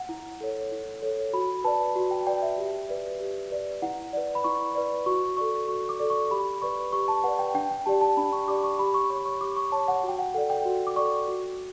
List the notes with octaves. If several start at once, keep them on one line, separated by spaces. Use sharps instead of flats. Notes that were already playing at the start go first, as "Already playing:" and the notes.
Already playing: F#5
E4
A4 C#5
E4
A4 C#5
F#4 B5
B4 D5 A5
F#4
G5
B4 D5 G5
E5
G4
B4 D5
G4
B4 D5
E4 F#5
B4 D5
B5
E4 C#6
B4 D5
F#4 C#6
A4 D5 C#6
F#4 C#6
D6
A4 D5
C#6
G4 B5
B4 D5 C#6
G4 C#6
A5
B4 D5 F#5
G5
D4 G5
G5
G4 D5 A5
A5
D4 B5
C#6
G4 D5 D6
C#6
G4 B5
C#6
C#5 C#6
C#6
G4 D6
C#6
C#5 A5
F#5
F#4
G5
F#5
A4 D5 F#5
G5
F#4
D6
A4 D5 C#6
F#4